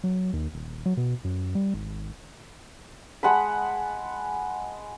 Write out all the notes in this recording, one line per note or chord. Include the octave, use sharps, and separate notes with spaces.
F#3
D#2
D#1
F#3
B2
F#2
G3
G#1
G#3 F#5 A5 B5